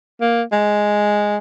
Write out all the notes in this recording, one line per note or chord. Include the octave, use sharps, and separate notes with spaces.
A#3
G#3